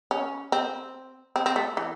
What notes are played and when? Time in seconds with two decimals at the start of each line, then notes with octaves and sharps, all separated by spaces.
0.11 C#4
0.52 C4
1.36 C4
1.46 C4
1.56 A3
1.77 E3